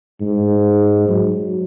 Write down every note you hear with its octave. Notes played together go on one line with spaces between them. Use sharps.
G#2
F#3